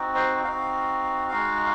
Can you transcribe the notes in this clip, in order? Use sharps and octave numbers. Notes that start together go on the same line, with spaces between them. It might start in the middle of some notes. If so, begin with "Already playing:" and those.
Already playing: C4 D#4 F#4
C5
C4 D#4 F#4 F5
G#3 D#4 F#4